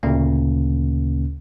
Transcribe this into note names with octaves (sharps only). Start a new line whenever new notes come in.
D2 A#2 C#3 A#3 C#4